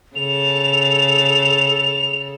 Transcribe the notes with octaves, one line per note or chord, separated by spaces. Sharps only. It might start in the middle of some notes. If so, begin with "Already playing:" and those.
C#3 A4 F7